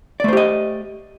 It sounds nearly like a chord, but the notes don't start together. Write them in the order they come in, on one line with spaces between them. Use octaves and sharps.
D5 A3 C5 G4 D#5